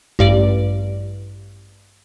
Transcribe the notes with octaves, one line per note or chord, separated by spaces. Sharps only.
A1 G2 D5